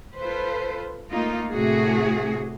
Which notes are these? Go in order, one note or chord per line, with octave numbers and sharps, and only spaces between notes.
F4 A4 B4 C5
A3 A#3 D#4 F4
A2 C3 A3 F#4 G#4